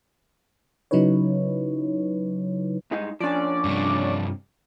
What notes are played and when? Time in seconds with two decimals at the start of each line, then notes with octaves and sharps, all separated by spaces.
0.91 C#3 F#3 D#4 E4 B4 C#5
2.91 G2 G#3 D#4
3.20 F3 C#4 D4 D5
3.65 G2 C3